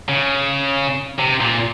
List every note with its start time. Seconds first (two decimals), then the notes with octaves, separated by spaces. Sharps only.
0.09 C#3
1.19 C3
1.41 A#2